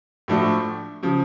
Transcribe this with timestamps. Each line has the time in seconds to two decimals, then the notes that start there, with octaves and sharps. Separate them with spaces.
0.28 A2 F3 A3 D4 F#4
1.03 C#3 F3